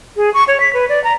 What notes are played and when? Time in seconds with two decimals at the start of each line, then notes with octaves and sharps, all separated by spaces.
0.16 G#4
0.34 C#6
0.48 C#5
0.60 B6
0.74 B4
0.89 D5
1.04 A#5